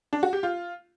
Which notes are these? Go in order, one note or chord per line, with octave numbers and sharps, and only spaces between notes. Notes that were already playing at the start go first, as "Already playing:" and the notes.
D4
F#4
G4
F4